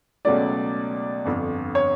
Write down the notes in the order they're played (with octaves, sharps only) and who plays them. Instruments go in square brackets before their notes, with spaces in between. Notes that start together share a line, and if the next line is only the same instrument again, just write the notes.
[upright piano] C#2 B2 F#3 A3 C#4 [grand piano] D5
[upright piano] G1 F2 D3
[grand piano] C#5